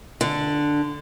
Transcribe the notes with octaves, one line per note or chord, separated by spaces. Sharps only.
D3